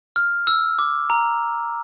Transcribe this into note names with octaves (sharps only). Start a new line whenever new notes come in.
F6
E6
D6
A#5